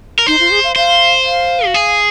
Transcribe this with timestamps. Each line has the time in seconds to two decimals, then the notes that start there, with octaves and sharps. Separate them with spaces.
0.19 A#4
0.26 D#4 C5
0.40 F4
0.51 G#4
0.64 F5
0.76 C5 F5
1.25 F5
1.66 F#4
1.74 G#4